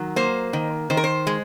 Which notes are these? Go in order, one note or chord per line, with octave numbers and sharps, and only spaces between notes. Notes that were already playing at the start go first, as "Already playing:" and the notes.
Already playing: D#3 F#3
A#3 C5
D#3
D#3 C5
A#4
C5
G#3